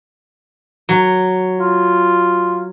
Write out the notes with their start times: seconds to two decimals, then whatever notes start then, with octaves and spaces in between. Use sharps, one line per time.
0.89 F#3
1.59 F4